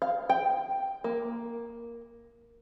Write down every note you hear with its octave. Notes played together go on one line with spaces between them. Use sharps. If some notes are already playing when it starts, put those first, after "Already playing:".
F5
G5
A#3